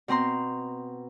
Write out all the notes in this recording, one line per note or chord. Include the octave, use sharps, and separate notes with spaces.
B2 C4 A#5 C6